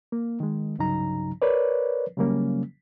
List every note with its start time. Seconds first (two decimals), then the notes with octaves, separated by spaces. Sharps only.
0.12 A#3
0.40 D#3 G#3
0.78 C2 G2 C#3 F#3 D#4 A#5
1.42 A#4 B4 C#5 D5
2.17 C#3 F#3 G3 A#3 C#4